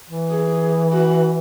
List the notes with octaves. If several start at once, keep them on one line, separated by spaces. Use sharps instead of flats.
E3
G#4
F#4